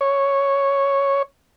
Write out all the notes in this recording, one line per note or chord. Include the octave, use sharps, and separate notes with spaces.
C#5